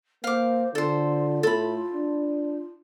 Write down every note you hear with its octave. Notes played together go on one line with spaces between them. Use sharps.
A#3 C5 F5 D6
D3 F4 A4 C5
A2 A4 B5
D4